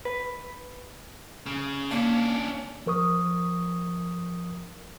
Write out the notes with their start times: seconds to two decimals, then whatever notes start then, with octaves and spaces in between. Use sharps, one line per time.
0.05 B4
1.46 C#3
1.91 A#3 C#4 D4
2.86 F3 A#4 C#6 D#6